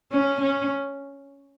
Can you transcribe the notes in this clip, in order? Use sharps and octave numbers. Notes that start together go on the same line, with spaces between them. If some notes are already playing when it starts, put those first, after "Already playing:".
C#4
C#4